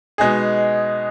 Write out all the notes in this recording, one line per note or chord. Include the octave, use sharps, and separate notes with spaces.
B2 G#3 D#4 G#4